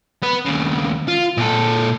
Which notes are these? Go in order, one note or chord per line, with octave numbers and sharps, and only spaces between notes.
B3 B4
D#2 C#3
F4
A#2 A4